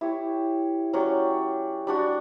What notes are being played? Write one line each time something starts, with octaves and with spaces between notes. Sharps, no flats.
E4 G4 C#5
F#3 C#4 G4 D5
G3 D4 F#4